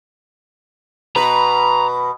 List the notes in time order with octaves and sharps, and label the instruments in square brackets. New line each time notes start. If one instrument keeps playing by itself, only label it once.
[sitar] B2 B4 [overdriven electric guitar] A#5